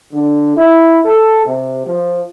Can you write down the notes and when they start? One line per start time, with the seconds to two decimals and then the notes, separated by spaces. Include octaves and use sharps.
0.13 D3
0.56 E4
1.05 A4
1.45 C3
1.85 F3